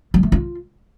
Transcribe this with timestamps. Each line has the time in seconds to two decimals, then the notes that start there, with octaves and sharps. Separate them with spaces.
0.14 G3
0.23 A3
0.32 F4